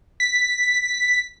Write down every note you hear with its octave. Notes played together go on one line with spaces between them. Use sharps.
B6